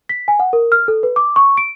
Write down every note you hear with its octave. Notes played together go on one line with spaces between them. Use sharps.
B6
G#5
F#5
A#4
F6
A4
B4
D6
C#6
D7